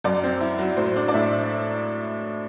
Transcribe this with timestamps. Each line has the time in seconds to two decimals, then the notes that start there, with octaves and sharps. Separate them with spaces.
0.04 F#2 D5
0.23 C4
0.40 E4
0.59 F#3
0.77 A2 C5
0.96 D4
1.08 D5
1.14 A2 E5